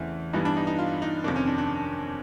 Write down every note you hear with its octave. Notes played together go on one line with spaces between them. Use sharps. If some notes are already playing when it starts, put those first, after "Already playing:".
Already playing: E2 C#3 E3 A3 C4 E4
G2 E3 G3 B3 D#4
D4
D#4
D#4
F4
D#4
F2 C3 D#3 D4
C#4
D4
D4